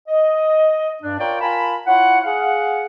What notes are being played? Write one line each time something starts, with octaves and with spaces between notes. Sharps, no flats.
D#5
G2 D4
F4 A#4 C#5 D5 G5
F4 A#4 G#5 A5 B5
E4 F4 C#5 F#5
G#4 F5 F#5